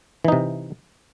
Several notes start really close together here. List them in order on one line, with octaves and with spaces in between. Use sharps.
E3 D#4 C3